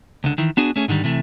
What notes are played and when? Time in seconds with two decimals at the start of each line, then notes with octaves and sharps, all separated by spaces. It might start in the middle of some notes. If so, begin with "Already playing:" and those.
0.24 C#2 D3
0.38 D#3 E3
0.57 B3 D4 F#4 G#4
0.76 A3 C#4 G#4
0.88 G#2 D3 D#3 G3
1.04 C3 E3 A3